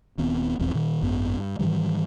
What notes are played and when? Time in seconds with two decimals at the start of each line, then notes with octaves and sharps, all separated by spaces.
0.18 D#1 D#2 B3 C4
0.59 E1 A#1 E2 C4
0.74 A#2 D#3
1.02 G#1 F#2 B3
1.38 G2
1.59 G#2 D#3 E3 G3